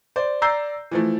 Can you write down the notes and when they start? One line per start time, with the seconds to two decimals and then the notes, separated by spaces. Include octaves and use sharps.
0.16 C5 D5
0.42 D5 A#5 E6 G6 C7
0.91 E3 F3 A3